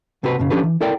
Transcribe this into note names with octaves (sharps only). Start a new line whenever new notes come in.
B1 C3 C4 F#4 B4
B1 F#2 C#3
F3 C#4 D4 G4 A4 B4
E3
E4 A4 A#4 D5 G5